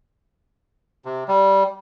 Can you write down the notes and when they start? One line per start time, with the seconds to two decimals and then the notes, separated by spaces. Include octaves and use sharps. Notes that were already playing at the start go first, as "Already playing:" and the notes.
1.05 C3
1.28 G3